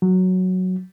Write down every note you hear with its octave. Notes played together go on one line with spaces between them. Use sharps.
F#3